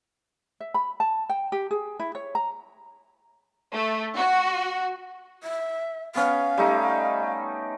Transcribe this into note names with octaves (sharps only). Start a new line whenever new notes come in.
E5
B5
A5
G5
G4
G#4
E4
C#5
A#5
A3
F#4
E5
B3 C#4 F5
G3 A3 D#4